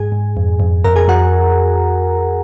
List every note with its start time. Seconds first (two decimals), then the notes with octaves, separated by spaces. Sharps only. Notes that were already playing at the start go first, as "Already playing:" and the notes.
Already playing: G#2 G#4 G#5
0.12 G#2
0.37 F2
0.60 F2
0.84 F2 A#4 A#5
0.96 G#4 G#5
1.08 F2 F#4 F#5